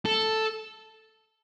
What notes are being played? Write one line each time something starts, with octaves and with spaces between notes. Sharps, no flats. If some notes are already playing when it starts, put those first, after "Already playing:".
A4